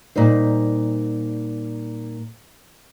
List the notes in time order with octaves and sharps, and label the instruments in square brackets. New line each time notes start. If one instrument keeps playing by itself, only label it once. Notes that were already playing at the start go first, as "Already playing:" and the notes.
[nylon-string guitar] A#2 G3 D#4 C5